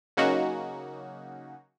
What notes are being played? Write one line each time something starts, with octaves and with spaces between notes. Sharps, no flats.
C#3 F#3 A#3 C#4 D#4 F#4